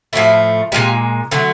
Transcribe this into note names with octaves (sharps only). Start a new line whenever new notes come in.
A2 F3 A3 E4 F#4
A#2 F3 G#3 F4 G4
D3 F#3 A3